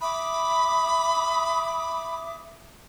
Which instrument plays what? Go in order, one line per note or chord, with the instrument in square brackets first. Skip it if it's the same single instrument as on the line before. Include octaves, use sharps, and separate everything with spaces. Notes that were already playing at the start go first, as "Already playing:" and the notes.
[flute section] E5 D6 D#6 [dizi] B5